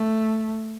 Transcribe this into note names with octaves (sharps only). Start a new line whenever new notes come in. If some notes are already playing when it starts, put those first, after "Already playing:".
Already playing: A3